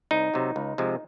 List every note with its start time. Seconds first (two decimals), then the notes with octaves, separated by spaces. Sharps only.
0.11 C2 D#4
0.34 C3 F#3
0.56 C#2
0.78 C3 F3 G#3